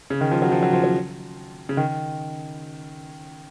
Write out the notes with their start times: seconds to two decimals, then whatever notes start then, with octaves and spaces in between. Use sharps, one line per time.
0.10 C#3
0.21 D#3
0.31 F3
0.42 F#3
0.52 F3
0.63 F#3
0.73 F3
0.84 F#3
1.69 C#3
1.77 D#3